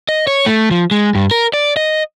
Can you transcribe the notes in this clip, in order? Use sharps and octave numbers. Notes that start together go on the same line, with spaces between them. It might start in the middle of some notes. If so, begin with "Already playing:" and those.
D#5
C#5
A3
F3
G#3
G2
A#4
D5
D#5